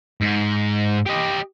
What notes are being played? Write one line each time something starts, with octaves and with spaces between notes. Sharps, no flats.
G#2
G4 D#5